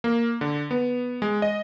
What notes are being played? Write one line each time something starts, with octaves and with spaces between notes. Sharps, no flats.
A#3
D3
B3
G#3
D#5